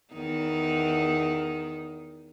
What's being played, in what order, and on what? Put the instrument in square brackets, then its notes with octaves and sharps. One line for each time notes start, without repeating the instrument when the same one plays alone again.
[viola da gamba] E2 D#3 D#4